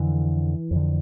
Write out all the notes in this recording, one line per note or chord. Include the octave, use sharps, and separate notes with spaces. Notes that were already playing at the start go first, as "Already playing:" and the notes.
Already playing: F2 D3 E3
F2 D3